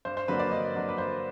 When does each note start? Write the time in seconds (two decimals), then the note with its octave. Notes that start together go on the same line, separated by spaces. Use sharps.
0.05 G2 C5
0.17 C5
0.28 D3 F#3 A#3 D4 B4
0.39 D5
0.51 G2 D#5
0.75 D3 F#3 A#3 D4
0.89 B4
0.97 G2 C5